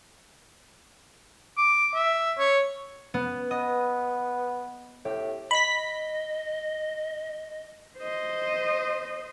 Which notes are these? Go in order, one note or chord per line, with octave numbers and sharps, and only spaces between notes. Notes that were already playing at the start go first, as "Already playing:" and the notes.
D6
E5
C#5
B3
B3 D#5
A2 G4
D#5 B5 B6
C5 D#5